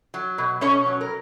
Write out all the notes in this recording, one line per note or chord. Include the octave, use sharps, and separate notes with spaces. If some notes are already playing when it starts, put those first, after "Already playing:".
F#3
B2
B2 C#4 C#5
F#3
A#4